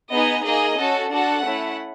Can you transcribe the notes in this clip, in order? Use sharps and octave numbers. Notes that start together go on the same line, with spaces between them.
B3 D#4 G#4 D#5
A#3 D#4 G#4 D#5
C#4 F#4 A4
D4 F#4 A4 F#5
A3 C#4 E4